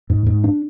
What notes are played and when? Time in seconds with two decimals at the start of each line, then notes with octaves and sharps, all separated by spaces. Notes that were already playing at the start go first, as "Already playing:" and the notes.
0.10 G#2
0.26 G#2
0.44 D4